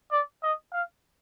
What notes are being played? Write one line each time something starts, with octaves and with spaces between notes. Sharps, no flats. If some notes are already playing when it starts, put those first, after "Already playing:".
D5
D#5
F5